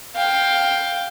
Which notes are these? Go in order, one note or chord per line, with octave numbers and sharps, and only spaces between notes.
F5 G5